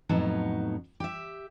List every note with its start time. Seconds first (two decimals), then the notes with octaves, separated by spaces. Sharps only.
0.09 F2 A2 F#3 B3 D#4 A5
1.00 G4 E5